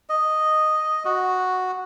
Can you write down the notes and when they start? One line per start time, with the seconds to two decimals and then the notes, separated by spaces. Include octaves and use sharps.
0.09 D#5
1.05 F#4